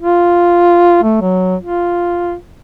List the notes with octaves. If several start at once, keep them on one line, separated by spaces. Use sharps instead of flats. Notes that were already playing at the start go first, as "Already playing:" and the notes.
F4
A3
F#3
F4